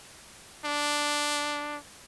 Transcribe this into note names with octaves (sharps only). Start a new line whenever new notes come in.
D4